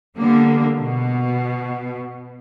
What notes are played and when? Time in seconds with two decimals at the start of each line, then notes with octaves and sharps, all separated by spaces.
0.16 D3 G3 A#3 B3
0.80 B2